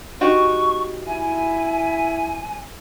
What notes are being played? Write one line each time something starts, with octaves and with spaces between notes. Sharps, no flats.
D#4 F#4 G4 C#6
E4 G#5